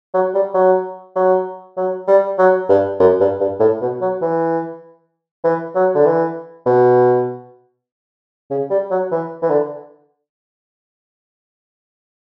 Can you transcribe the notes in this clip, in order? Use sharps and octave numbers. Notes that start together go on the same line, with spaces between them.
F#3
G3
F#3
F#3
F#3
G3
F#3
G2
F#2
G2
G2
A2
B2
F#3
E3
E3
F#3
D3
E3
B2
C#3
G3
F#3
E3
E3
D3